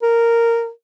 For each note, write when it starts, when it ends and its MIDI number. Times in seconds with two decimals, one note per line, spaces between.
0.02 0.69 70